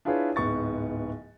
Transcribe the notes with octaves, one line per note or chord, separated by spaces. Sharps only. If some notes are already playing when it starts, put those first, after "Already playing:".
D4 E4 F4 G#4 B4 C#5
D1 G#2 B3 C#6 A6